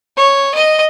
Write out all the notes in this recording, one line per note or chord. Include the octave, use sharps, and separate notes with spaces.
C#5
D#5